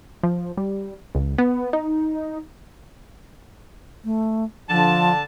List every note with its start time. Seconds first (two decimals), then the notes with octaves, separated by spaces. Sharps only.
0.23 F3
0.57 G3
1.15 C#2
1.38 B3
1.73 D#4
4.04 A3
4.70 D3 F3 A5